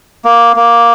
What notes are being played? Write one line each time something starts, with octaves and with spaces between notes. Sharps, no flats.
A#3
A#3